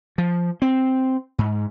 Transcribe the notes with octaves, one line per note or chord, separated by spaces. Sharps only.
F3
C4
G#2